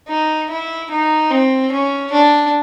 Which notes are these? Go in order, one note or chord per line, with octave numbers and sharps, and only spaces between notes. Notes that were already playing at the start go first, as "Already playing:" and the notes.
D#4
E4
D#4
C4
C#4
D4